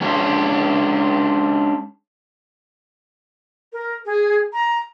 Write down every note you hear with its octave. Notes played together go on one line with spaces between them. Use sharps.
G#3 C#4 D4 F4
A#4
G#4
A#5